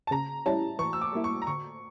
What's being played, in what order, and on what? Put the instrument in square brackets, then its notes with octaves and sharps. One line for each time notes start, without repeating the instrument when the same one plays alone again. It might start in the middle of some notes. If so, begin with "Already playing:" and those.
[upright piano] A5
[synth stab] C#3 [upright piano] A#5
[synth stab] G3 C#4 E4 [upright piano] A5
[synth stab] E3 [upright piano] C#6
[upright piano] E6
D6
[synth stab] G3 A#3 E4
[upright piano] C#6
A#5
[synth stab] D3 [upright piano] C#6